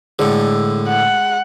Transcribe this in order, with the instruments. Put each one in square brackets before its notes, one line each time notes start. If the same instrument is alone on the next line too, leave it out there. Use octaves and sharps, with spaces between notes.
[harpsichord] A2 D3 [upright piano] G#3
[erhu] F#5